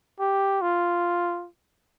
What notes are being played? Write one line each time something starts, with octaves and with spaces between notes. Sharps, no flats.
G4
F4